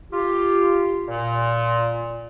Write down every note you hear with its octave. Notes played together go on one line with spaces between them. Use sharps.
F4 G4
A#2